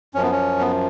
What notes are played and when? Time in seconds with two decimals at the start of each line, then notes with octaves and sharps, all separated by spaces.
0.14 F#2 F3 C#4
0.23 B3
0.31 C#4
0.60 B3